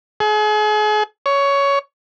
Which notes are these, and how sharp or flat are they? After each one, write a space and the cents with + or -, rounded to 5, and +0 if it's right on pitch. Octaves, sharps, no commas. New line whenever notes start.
G#4 +40
C#5 +15